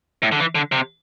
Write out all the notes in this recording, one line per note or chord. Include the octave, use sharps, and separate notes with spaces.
A2
D3
E3
D3
C3